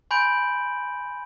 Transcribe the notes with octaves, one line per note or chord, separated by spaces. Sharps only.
G#5 B5 C6 G6 D7 F#7